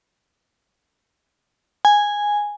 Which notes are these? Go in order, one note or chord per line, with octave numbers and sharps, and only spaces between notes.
G#5